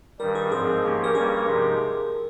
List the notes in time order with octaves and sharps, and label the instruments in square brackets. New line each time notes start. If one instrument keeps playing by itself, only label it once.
[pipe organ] G2 D#3 G3 [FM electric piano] A#4
[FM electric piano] G#4
[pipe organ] G#2 F3 G#3 C4 [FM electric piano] G#4
[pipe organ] F3 A#3 C#4 G4
[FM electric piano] A#4
[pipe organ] G2 G3 A#3 C#4 [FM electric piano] G#4
[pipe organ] C3 F3 G#3 D#4 G4